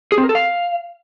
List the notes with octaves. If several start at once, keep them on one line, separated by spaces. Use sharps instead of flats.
G#4
C4
A#4
A4
F5